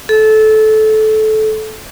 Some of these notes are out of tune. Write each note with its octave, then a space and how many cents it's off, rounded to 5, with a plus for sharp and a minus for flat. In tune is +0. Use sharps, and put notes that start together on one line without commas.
A4 -20